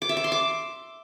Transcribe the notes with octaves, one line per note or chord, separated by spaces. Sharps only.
D6
E5
D6
C6
D6